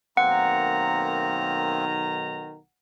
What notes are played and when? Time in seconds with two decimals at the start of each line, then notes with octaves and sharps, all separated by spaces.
0.17 B1 D#3 A#3 C4 F#5 A#5